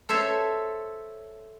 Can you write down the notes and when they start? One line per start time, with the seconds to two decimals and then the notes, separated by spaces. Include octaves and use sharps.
0.09 A4 C5 C#5 E5